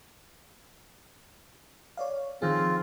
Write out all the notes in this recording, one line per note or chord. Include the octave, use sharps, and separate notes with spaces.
C#5 D5 F5
D#3 F3 C4 F4 G#4